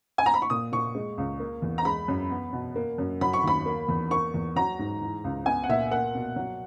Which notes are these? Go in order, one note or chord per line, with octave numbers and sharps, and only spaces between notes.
G#5
A#5
B5
C#6
A#2 D#6
A#2 C#6
G#3
C#2
A#3
E2
A#5
G#3 B5
F#2
B3
B2
A#3
F#2
F#3 B5
C#6
D#2 B5
A#3
E2
A#3 C#6
E2
F#3 A#5
G#2
E3
C#2
B3 G#5
F#5
A#2 E5
A#3 F#5
B2
F#3